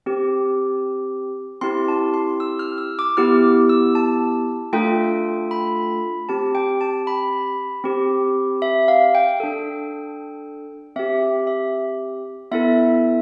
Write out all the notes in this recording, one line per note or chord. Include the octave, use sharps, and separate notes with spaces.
C4 G4
C4 E4 G4 C6
A5
C6
E6
F6
E6
D6
B3 E4 G4 F6
E6
A5
A3 D4 F4 A4 G5
B5
C4 G4 A5
G5
A5
B5
C4 G4
E5
F5
G5
D4 A4
C4 G4 E5
E5
B3 E4 A4 E5